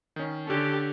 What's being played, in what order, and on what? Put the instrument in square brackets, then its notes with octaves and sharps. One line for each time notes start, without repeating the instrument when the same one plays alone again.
[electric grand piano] D#3 C#4
[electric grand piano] D3 C#4 [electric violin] G4 A4